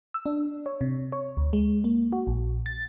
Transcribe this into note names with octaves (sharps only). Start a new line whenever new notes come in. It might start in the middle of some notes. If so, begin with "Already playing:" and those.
E6
D4
C#5
C3
C#5
D2
G#3
A#3
F#4
A#1
A6